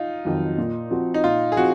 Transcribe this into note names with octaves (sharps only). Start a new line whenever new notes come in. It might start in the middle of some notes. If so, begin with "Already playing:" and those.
Already playing: D#4 F4
F2 D#3 F#3
A#2
F3 C4 F#4
D#4
A#2 F4
G#4
F3 C4 F#4